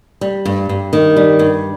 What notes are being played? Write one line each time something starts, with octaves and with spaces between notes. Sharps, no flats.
G3
G2
G2
D#3
G3
G2